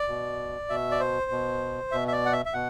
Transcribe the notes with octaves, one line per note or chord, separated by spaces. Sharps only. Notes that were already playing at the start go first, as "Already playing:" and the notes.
Already playing: D5
B2
B2 E5
D5
C5
B2
B2 E5
E5
D5
F#5
E5
E5
B2 F#5